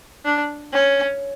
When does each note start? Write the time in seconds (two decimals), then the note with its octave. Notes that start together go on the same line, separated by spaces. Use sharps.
0.25 D4
0.73 C#4